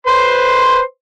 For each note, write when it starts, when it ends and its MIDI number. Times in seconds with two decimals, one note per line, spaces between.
0.07 0.80 71
0.07 0.80 72
0.07 0.80 84